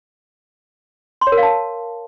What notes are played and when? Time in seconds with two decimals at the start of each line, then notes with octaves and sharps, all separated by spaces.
1.21 C6
1.27 C#5
1.32 A#4
1.37 F5
1.43 A5